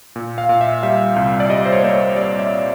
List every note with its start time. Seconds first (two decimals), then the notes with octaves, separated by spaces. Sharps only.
0.16 A#2
0.38 F5
0.49 A#2
0.61 E5
0.83 G3 E5
1.16 C2
1.40 D5
1.50 G3 D#5
1.66 C5
1.73 C#5
1.83 A#3 C5
1.94 C#5
2.16 G3 D5
2.39 E5